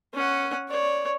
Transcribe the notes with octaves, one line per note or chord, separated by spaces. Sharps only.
C#4 F#5
C#5 D5